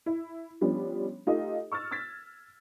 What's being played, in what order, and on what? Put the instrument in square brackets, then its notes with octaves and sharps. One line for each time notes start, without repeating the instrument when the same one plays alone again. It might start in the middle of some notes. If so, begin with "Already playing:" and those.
[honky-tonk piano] E4
F3 G3 B3 C#4 D4
A3 D#4 F4 G4 A4 D#5
C#6 E6 F6 A6
E6 G#6 A6 B6